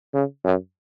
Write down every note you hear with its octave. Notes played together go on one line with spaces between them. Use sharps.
C#3
F#2